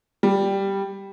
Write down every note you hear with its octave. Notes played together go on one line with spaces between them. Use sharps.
G3